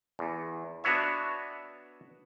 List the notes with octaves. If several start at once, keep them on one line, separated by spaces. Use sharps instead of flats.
E2
B3 D4 F#4 B4 C#5 E5